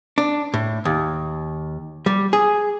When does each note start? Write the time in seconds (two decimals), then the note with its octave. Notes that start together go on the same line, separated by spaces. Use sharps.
0.18 D4
0.54 A2
0.85 D#2
2.06 G3
2.33 G#4